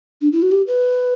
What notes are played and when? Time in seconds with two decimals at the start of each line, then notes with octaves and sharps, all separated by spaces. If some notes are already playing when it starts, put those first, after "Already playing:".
0.21 D4
0.32 E4
0.42 F#4
0.52 G4
0.67 B4